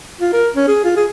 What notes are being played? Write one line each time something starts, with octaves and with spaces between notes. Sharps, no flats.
F4
A#4
C#4
G#4
F4
G#4